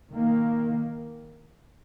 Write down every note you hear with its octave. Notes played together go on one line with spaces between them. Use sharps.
D#3 A#3